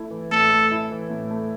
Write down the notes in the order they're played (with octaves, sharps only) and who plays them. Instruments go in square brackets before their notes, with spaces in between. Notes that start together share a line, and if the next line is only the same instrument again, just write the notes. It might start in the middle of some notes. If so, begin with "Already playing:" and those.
Already playing: [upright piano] A3 E4
E3
[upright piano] A2 [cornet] A4
[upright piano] A3
E4
E3
A2
A3